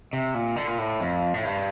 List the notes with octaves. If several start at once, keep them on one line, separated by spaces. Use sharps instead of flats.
C3
A#2
D3
A#2
A2
F2
A2
G2